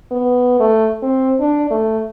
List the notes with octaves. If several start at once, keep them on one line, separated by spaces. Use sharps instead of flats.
B3
A3
C4
D4
A3